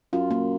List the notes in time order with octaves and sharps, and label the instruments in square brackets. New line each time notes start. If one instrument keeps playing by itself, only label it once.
[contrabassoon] F#2 [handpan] F4
[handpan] A#3